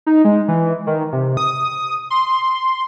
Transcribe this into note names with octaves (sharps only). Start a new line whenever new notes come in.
D#4
G#3
E3
D#3
C3
D#6
C6